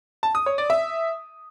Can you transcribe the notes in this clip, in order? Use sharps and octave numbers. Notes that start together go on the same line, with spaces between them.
A5
D#6
C#5
D5
E5